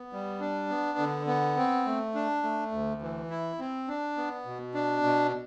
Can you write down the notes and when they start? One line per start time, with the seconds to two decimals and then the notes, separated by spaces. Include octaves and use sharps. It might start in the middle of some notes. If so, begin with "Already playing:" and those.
Already playing: B3
0.12 G3
0.40 D4
0.70 B3
0.98 D3
1.27 B3
1.57 C4
1.86 A3
2.14 D4
2.43 A3
2.72 D2
3.02 E3
3.30 E4
3.59 C4
3.88 D4
4.17 B3
4.45 B2
4.74 D4
5.03 B2